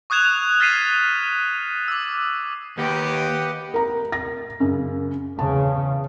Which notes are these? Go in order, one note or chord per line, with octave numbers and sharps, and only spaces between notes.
C#6 D#6 F#6 G#6 E7 F7
F6 A6 B6 C7 D#7 E7
D6 E6
D#2 G4 B4 D#5 F#5
A#4 A#5
A#6
F#2 C#3
E2 C#3 A5